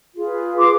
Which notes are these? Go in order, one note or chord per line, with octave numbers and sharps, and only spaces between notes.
F4 G#4 B4
C6 D6